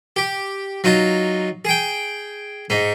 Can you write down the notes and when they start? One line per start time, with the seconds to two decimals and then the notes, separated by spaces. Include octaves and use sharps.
0.16 G4
0.84 F#3 D#4 F4
1.65 G#4 G5
2.70 G#2 D#4